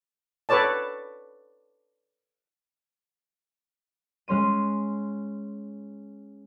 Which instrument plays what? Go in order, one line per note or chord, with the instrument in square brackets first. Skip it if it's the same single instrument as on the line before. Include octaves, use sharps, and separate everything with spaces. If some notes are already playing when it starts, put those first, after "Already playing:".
[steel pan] A4 B4 C#5 D5 A5
[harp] G#3 C#4 C6 D#7